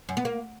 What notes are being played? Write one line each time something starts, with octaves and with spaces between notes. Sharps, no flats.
F#2
B3
A#3